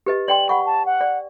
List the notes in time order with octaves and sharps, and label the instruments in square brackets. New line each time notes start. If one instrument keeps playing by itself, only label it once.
[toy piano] G4 B4 D#5
[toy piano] D5 G5 C6 [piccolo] F#7
[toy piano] F#5 C#6 [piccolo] B5
[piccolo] A5
F#5
[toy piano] D5